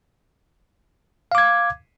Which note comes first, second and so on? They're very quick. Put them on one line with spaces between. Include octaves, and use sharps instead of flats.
F5 D6 G#6